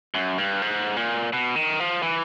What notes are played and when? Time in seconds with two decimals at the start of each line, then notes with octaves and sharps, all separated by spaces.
0.14 F#2
0.38 G2
0.62 G#2
0.97 A#2
1.33 B2
1.56 D#3
1.80 F3
2.02 E3